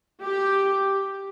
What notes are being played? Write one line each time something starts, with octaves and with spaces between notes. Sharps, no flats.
G4